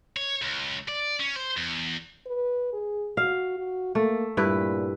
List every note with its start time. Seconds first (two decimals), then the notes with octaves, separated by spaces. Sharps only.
0.16 C#5
0.42 C#2
0.88 D5
1.20 C#4
1.36 C5
1.57 E2
2.26 B4
2.73 G#4
3.17 F#4 F5
3.58 F#4
3.95 A3 A#3
4.37 G2 A#2 E4 B4